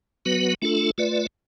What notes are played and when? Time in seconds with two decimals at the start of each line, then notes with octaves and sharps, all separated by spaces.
0.25 F#3 B3 F#4 B4
0.62 A3 D4 F4 A4
0.98 A3 F4 B4 D5